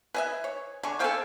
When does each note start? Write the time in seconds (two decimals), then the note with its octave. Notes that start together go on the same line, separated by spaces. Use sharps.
0.14 B4 D#5 E5 G#5
0.44 C#5
0.83 D3 G#5 C#6
1.00 A4 C5 F5 G5 G#5